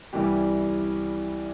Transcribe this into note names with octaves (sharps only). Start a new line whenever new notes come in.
C2 C3 E3 G3 G4